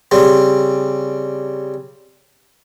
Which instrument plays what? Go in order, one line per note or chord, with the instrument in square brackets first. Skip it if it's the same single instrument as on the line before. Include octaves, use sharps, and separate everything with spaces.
[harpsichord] C#3 G3 C4